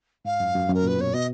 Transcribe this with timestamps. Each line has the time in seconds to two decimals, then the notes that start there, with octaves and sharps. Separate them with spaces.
0.25 G#2 F5
0.40 F#2
0.55 F#2
0.69 F#2 A#4
0.84 A#2 B4
0.98 B2 C#5
1.13 B2 D#5